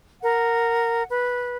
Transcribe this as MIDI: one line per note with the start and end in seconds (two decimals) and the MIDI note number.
0.22 1.04 70
0.22 1.04 78
1.10 1.57 71